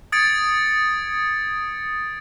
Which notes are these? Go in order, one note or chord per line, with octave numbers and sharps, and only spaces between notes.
D#6 G#6 A6 C#7 D7